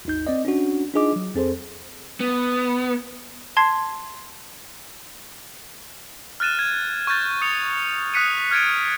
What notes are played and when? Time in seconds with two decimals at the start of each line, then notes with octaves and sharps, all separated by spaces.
0.05 G#1 D#2 D#4 G6
0.27 C4 D5 D#5
0.45 C#4 D4 F#4
0.94 D4 D#4 F4 G#4 D#5 D6
1.16 F#3
1.35 F2 C4 G#4 A4 C5
2.20 B3
3.57 A5 C6 G#6 C7
6.40 F6 F#6 A6 D#7 E7
6.59 G#6
7.07 C#6 F6 G6 A6
7.41 D#6 C#7 F7
8.14 D#6 F#6 B6 C#7 D#7
8.51 F6 G#6 A6 D7 D#7